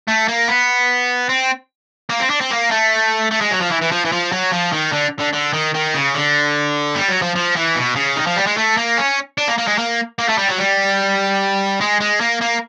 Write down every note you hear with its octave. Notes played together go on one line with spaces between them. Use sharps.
A3
A#3
B3
C4
A#3
C4
D4
C4
A#3
A3
A3
G#3
F#3
F3
E3
E3
F3
E3
F3
F#3
F3
D#3
D3
D3
D3
D#3
D#3
C#3
D3
G3
F#3
F3
F3
E3
B2
C#3
D#3
F3
G3
G#3
A3
A#3
C#4
D4
A#3
A#3
G#3
A#3
A#3
A3
G3
F#3
G3
G#3
G#3
A#3
A#3